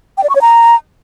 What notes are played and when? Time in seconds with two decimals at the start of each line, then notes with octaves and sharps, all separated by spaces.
0.18 G5
0.23 D5
0.29 C#6
0.35 C#5
0.41 A#5